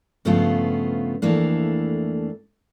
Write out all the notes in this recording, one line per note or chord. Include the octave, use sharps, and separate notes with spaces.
G2 C#3 F3 A3 B3 F4
F2 E3 A3 A#3 D4